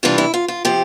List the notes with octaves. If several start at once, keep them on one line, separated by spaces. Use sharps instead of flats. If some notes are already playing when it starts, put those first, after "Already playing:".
C3 E3 G3 D4 F4
E4
F4
F4
C3 F3 G4